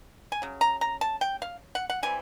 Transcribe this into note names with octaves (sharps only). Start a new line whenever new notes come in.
G#5
C#3 F#3
A#5
A#5
A5
G5
F5
F#5
F#5
E3 G3 C4 G#5